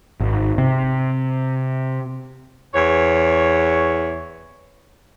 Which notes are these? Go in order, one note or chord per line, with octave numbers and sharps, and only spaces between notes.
G#1
C3
E2 C#5